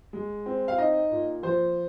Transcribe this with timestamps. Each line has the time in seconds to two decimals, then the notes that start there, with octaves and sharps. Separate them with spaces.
0.13 G#3
0.46 C4
0.68 F5
0.78 D#4 D#5
1.11 A#2
1.43 F3 C5